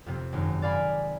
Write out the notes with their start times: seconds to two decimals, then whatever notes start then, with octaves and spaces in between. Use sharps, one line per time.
0.06 F2 C3
0.33 G#1 F#2
0.62 D5 F5 G#5 B5